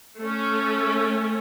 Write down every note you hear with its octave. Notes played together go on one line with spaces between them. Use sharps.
A3 C#4